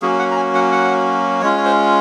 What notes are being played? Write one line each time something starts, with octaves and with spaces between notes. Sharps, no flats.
F#3 A#3 C#4 F#4 G#4
F#5
A#5
G#5
F#5
F#5
G#3 C#4 F4 C#5
C#5
C5